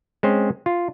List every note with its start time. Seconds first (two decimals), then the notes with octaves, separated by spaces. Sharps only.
0.23 G#3 C4 C#4 C5
0.66 F4